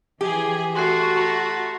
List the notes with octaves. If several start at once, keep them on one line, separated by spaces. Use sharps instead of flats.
E3 G4 G#4
A3 F#4 C6 F#6 C7
A#5 A#6